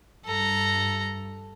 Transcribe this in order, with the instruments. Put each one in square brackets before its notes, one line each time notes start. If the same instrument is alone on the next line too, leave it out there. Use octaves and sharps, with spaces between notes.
[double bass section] G2 [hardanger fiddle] A4 A#5